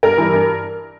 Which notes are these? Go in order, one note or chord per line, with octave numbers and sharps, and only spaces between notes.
G2 A#4
E3 G3
G2